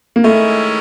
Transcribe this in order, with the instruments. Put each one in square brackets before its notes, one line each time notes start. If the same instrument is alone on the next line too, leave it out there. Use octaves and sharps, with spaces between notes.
[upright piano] A#3
[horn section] D#3 G#3 C#4 E4 [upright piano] A3